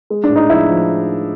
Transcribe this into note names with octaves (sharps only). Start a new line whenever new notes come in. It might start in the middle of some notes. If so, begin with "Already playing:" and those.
G#3
D4
A2
D#4
F3 E4
F3